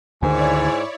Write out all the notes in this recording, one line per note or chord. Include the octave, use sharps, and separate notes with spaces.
D2 G#2 D3 D#3 E4 C#5 D5 G#5